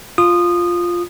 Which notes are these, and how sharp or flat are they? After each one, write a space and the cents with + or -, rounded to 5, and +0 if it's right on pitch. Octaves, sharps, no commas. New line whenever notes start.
F4 +0 D#6 -20